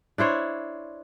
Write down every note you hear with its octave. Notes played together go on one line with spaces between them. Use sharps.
D4 E4 C5 C#5